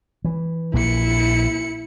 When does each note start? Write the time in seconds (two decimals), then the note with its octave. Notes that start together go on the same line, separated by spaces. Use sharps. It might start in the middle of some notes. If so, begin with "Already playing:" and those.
0.24 E3
0.73 A#1 A#3 E4 C#7